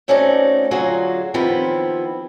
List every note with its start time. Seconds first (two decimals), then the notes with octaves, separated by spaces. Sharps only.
0.08 A3 C4 C#4 D#4 F#4 D5
0.71 D3 F#3 F4 F#4 G#4
1.34 D#3 F3 B3 C4 E4 G4